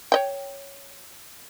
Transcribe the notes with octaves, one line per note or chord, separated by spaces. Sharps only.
C#5 D#5 G5